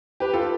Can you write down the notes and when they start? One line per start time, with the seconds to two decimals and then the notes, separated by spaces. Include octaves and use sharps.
0.20 G4 B4
0.33 F4 A4